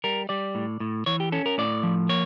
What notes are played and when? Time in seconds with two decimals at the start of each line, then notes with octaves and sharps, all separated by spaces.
0.04 G3 A#4
0.29 G3 D5
0.55 A2
0.80 A2
1.06 E3 C#5
1.20 G4
1.32 C#4 A4
1.46 A#4
1.58 A2 D5
1.83 F3
2.09 A#3 C#5